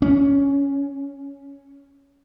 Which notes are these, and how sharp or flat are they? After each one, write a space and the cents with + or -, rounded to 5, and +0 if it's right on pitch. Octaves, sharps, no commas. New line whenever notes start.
C#4 +10